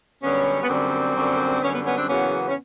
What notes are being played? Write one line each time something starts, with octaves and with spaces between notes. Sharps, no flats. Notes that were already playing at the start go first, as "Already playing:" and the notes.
F#2 D3 G3 B3 C#4
B3
F#2 D3 G3 A#3 C4
F#2 D3 G3
F#2 D3 G3 B3 C#4
B3
B3 C#4
C4 D4
E2 C#3 F#3 A#3 B3 C#4
C#4